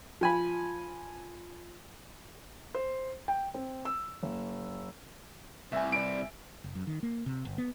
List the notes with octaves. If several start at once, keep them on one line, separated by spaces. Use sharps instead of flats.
F3 G#5 B5
C5
G5
C4
E6
F#1
C2 A3 B4 E5 G#5
B4 D5 D7
F#1
F#2
D#3
A#3
C3
G1
B3